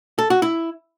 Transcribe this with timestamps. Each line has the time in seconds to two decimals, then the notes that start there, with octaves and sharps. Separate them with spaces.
0.19 A4
0.30 F#4
0.42 E4